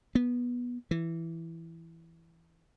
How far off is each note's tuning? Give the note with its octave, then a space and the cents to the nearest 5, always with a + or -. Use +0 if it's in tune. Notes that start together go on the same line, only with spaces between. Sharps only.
B3 -15
E3 +5